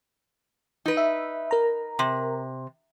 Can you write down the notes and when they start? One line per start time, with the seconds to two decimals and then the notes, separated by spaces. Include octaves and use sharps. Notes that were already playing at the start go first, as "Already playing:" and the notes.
0.86 D#4 B4
0.97 E5
1.51 A#4 A#5
1.99 C3